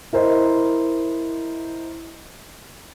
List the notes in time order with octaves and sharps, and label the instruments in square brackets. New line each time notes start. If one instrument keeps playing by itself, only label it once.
[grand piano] E4 A#4 C5 D#5